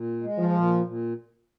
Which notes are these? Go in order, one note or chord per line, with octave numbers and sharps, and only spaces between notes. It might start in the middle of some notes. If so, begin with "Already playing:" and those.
Already playing: A#2
G#3
F3
A#2
A#2